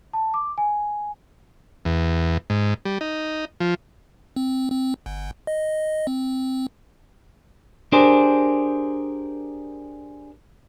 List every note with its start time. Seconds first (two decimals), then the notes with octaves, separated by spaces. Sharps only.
0.13 A5
0.34 D6
0.58 G#5
1.85 E2
2.50 G#2
2.85 G3
3.01 D#4
3.60 F3
4.36 C4
4.71 C4
5.06 G1
5.47 D#5
6.07 C4
7.92 D4 G4 G#4 A#4 C5